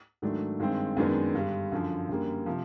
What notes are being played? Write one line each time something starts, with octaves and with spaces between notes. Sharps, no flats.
G#2 D#3 F#3 A3 D4
G2 D#3 G#3 C4
F#2 D#3 G#3 B3 D4
G2 D3 G3
F#2 D3 F3
F#2 D3 G3 A#3
C3 F3